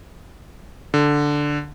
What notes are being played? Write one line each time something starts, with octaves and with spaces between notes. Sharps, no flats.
D3